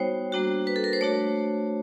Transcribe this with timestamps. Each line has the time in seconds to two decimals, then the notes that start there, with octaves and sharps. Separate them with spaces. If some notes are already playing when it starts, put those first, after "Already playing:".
Already playing: G3 B3 D#4 F#4 C5 C#5 G5
0.32 G3 A#3 D4 F#4
0.67 B4
0.76 A4
0.84 A#4
0.93 C5
1.01 A3 D4 F#4 C#5